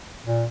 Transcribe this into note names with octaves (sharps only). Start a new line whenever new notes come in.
A#2